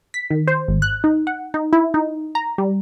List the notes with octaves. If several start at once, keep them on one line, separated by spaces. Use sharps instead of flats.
B6
D#3
C5
G#1
F#6
D#4
F#5
D#4
E4
D#4
A#5
G3